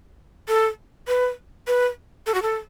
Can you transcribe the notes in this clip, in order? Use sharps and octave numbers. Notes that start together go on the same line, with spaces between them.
A4
B4
B4
A4
F#4
A4